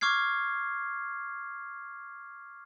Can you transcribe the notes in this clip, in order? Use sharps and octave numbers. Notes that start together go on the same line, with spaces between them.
C#6 D6 F6 G#6 C7